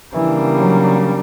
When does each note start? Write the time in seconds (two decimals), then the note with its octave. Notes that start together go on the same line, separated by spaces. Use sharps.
0.14 C#3 E3 G3 A#3 D4
0.58 F#3